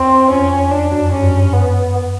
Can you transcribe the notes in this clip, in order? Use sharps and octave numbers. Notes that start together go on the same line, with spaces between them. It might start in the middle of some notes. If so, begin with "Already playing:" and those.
Already playing: E2 C4
F2 C#4
F2 D4
F#2
G2 C#4
F#2
G2
B3